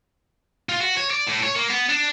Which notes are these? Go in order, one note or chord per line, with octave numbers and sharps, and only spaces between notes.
F4
F#4
C#5
D5
A2
C#5
A#3
B3
D4